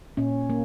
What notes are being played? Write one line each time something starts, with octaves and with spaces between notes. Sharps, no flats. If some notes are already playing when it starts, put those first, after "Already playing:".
A#2 C#4
A#3